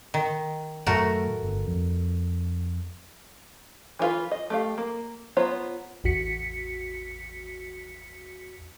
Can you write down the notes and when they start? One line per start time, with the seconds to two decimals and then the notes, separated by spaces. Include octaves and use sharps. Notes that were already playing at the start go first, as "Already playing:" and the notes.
0.14 D#3
0.86 F#2 A2 D#3 A3 F#4 A#4
1.43 G1
1.67 F2
3.99 E3 D4 F4 B4
4.31 D#5
4.50 A3 G4 F5
4.78 A#3
5.37 B3 F4 C5 C#5 A#5
6.04 A1 E2 F#4 B6 C#7